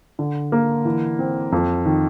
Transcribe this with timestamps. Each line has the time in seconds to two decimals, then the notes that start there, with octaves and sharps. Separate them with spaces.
0.19 D3
0.52 A#3
0.85 E3
1.19 C4
1.52 F2
1.86 D#3